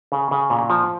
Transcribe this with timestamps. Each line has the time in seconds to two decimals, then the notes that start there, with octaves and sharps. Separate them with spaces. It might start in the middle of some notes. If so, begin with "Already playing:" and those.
0.12 C#3
0.31 C#3
0.50 A#2
0.70 F3